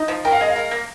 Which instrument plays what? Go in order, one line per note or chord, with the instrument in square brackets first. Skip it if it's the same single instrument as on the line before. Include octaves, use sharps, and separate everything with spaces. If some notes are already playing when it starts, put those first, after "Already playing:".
Already playing: [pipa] D#4
F3
[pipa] A#4 [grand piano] G5
[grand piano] F5
[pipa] G#3 [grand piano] D#5
[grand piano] F5
[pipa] A#4
A#3